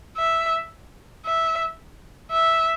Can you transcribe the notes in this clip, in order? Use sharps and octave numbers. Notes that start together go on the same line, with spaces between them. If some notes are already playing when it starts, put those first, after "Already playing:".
E5
E5
E5